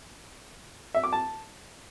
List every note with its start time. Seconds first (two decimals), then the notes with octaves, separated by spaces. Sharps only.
0.94 E5
1.04 D6
1.13 A5